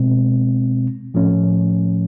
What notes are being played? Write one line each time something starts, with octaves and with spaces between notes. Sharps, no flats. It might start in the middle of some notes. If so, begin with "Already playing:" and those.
Already playing: B2 G#3 C4
A2 F3 A3 C#4